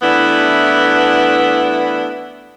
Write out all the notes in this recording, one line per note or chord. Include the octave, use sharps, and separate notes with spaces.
E3 A3 B3 D4 E4